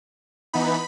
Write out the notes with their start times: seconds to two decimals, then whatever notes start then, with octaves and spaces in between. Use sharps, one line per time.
0.53 E3 B3 D#4 B5